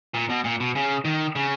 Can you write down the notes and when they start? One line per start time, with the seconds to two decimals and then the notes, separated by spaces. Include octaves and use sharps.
0.15 A#2
0.30 B2
0.44 A#2
0.60 B2
0.75 C#3
1.05 D#3
1.36 C#3